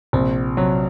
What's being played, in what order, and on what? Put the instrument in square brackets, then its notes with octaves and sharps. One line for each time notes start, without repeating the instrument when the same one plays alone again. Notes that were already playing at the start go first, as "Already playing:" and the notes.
[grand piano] A#1 [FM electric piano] C3 C4
[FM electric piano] C3 C4 [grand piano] F#3